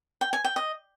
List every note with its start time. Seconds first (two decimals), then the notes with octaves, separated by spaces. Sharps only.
0.21 G5
0.33 G#5
0.44 G5
0.56 D#5